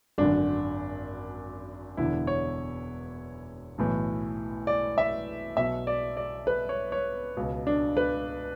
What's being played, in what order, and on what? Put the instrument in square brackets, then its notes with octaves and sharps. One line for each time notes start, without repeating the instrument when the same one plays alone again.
[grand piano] G#1 F#2 D3 D4
E1 E2 D3 E4
C#5
B1 A2 E3
D5
E5
B1 B2 E5
D5
D5
B4
C#5
C#5
C#2 B2
D4
B4